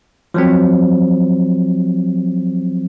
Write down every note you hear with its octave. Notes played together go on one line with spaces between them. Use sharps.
F3 F#3 C4